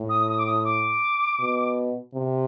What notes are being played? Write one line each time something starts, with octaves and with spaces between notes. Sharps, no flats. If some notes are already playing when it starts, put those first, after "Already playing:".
Already playing: A2
D#6
D#6
D6
D#6
D6
B2
C3